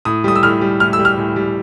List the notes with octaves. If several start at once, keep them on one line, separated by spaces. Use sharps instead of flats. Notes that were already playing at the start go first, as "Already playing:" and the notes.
A2 D#6
G3 D#6
E6
A2 F6
G3
A2 F6
E6
G3
F6
A2
G3